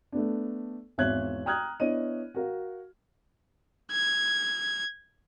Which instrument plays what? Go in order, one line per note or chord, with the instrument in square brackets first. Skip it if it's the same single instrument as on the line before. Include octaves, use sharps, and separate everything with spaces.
[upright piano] A3 B3 D4
G#1 E2 C#5 E5 F#6 G#6
G5 A#5 D#6 F6 F#6 G#6
B3 D4 E4 C#5 D#5 D#7
F#4 A#4 F5
[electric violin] G#6